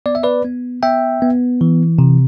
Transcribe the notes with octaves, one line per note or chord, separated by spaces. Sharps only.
B3 D5
E5
B4 D5
B3
B3 E5 G5
B3
E3
C3